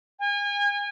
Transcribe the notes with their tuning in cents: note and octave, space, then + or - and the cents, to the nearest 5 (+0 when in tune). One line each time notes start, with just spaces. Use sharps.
G#5 -35